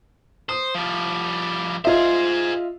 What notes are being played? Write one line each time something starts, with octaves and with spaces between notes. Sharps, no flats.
C5 D#6
F3 G3
F4 G#4 C5 D#5 E5